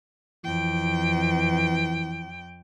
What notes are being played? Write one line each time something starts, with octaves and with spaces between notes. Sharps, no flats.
F2 E3 G5